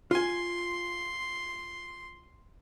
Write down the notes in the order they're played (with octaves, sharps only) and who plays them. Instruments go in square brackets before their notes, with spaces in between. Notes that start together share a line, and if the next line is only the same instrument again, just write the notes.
[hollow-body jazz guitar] F4 G#5 [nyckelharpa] C6